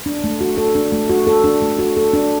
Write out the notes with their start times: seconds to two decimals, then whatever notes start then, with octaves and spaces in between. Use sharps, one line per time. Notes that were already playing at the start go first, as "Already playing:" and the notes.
0.06 D4
0.24 A3
0.41 F#4
0.57 A4
0.75 D4
0.92 A3
1.09 F#4
1.27 A4
1.44 D4
1.62 A3
1.79 F#4
1.97 A4
2.13 D4